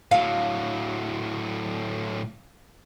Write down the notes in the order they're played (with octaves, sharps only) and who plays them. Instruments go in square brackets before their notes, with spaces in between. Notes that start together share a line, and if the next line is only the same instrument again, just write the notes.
[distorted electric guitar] A2 F#3 [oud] F5